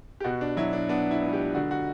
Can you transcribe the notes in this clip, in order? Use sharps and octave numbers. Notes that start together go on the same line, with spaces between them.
G4
B2 F#4
D4
F#3 E4
D4
B3 D4
E4
C#2
G4
D3 F#4
F#4